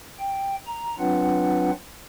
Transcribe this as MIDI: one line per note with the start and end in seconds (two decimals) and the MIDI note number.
0.19 0.55 79
0.66 0.95 82
0.99 1.71 54
0.99 1.71 60
0.99 1.71 62
0.99 1.71 65
0.99 1.71 71
0.99 1.71 78